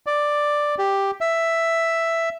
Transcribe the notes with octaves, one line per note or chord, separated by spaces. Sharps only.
D5
G4
E5